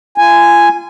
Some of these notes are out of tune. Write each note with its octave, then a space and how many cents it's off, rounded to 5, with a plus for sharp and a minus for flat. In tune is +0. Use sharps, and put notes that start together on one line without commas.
F4 -35 G#5 +0